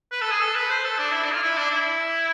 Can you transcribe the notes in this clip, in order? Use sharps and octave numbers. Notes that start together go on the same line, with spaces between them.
B4
A4
G#4
A4
B4
C5
A4
D4
E4
D4
F4
E4
D4
E4